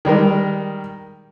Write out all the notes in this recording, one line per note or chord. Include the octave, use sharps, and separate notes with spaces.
D#3 G3 G#3 A#4